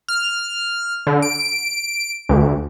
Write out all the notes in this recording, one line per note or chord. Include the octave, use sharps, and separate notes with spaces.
F6
D3
D7
D2